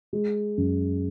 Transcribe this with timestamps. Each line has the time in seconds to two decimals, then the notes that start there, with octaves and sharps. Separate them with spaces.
0.13 G#3
0.58 F#2